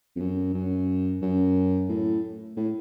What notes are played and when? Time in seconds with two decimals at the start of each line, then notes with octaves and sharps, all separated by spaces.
0.16 F2
0.20 F#2
0.54 F#2
1.22 F#2
1.89 A2
2.57 A2